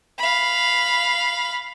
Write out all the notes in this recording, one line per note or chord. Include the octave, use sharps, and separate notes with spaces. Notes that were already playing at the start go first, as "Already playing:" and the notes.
F5 B5